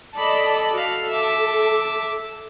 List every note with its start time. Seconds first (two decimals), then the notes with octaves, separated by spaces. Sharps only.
0.16 A4 D5 D#5 A5 B5
0.73 F#4 A4 F5
1.09 E5 D6